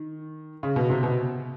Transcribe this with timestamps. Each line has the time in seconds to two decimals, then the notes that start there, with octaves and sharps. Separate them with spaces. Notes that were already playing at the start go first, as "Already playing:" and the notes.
Already playing: D#3
0.63 C#3
0.76 B2
0.90 C3
1.03 B2